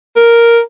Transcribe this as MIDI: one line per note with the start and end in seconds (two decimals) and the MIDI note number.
0.16 0.60 70